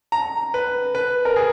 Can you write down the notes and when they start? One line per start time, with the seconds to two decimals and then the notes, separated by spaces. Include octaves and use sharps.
0.12 A#5
0.54 B4
0.95 B4
1.25 A#4
1.36 G#4